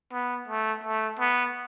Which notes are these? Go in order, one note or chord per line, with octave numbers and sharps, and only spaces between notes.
B3
A3
A3
B3